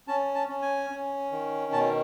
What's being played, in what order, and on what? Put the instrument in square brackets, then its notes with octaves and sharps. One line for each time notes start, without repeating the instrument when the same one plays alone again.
[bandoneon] C#4 A5
A5
C#4
G#5
C#4
D#3
B2 A5